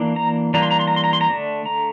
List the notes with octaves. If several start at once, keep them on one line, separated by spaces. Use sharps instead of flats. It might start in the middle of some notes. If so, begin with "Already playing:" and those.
Already playing: E3 A#3 D4
A#5
E3 G3 A#3 D4 A#5
C6
A#5
C6
A#5
C6
A#5
C6
A#5
D3 A3 D4
A#5